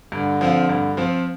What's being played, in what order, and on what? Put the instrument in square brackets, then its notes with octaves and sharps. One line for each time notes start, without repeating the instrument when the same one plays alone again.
[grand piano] G2 [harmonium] D3
[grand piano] F3 C4 F4
G2
F3 C4 F4